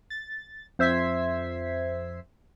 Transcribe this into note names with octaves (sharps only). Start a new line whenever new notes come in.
A6
F2 C5 E5 G#6 B6 C7